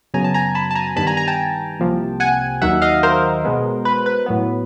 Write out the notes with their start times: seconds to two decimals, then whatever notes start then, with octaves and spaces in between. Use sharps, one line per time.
0.14 F#2 C#3 F#3 B3 G#5 A#5
0.24 A5
0.34 G#5 A#5
0.55 A5 B5
0.71 A5
0.75 G#5 A#5
0.96 G2 D#3 G3 B3 A5 B5
1.07 G#5 A#5
1.17 G#5 A#5
1.28 G5 A5
1.79 C2 C3 F3 A#3
2.20 F#5 G#5
2.62 D#2 D#3 F#3 E5 F#5
2.82 D#5 F5
3.03 A#4 C5
3.45 B2 G#3 B3
3.85 B4
4.06 B4
4.26 A2 F#3 B3